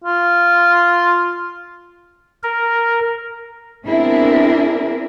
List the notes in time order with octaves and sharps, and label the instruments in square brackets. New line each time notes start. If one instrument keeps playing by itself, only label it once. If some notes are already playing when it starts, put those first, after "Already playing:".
[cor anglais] F4
[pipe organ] A#4
[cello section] B3 C4 D4 E4 G#4 A#4